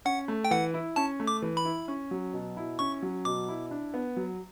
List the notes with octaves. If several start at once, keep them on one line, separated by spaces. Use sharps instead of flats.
C#4 F#5
A3
G5
E3 F#5
E4
C#4 A5
A3
D6
E3
B5
E4
C#4
F#3
B2
E4
C#4 C#6
F#3
B2 D6
E4
D4
B3
F#3